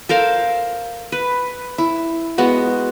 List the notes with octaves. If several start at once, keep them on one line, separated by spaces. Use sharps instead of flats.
A4 A#4 C5 F5
B4
E4
G#3 B3 F#4